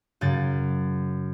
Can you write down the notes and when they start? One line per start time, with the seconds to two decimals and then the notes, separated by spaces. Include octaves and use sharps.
0.21 F#2 C#3 A6